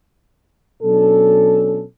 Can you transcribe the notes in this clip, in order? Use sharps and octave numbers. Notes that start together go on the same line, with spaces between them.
B2 F#3 C#4 D4 A4